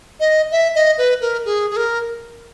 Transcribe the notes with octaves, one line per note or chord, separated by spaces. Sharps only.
D#5
E5
D#5
B4
A#4
G#4
G#4
A#4